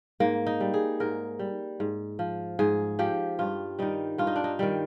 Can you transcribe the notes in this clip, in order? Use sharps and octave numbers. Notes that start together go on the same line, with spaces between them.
G#2 A#3
D#4
G3
G#4
G#2 A#4
G3
G#2
F3
G#2 G#4
F3 G4
G2 F4
D#3 G3 D#4
G2 F4
D#4
D4
D#4
D#3 G3